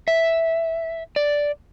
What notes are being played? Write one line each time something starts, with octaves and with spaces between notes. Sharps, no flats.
E5
D5